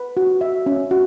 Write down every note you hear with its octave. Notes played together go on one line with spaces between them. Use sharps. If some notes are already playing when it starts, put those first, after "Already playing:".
Already playing: B4
F#4
E5
C#4
F#4